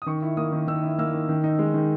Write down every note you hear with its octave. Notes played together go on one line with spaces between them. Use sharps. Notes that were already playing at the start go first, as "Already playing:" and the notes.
D#6
D#3 C#6
E4
A#3 D#6
D#3
D#3 E6
E4
A#3 E6
D#3
D#3
D#4
G#3
D#3